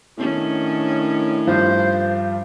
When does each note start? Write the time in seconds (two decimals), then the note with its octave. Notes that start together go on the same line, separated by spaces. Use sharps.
0.17 A2 D#3 C#4 D4
1.47 G2 F3 C5